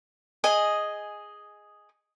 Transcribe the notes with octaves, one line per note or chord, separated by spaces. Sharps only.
G#4 D#5 G#5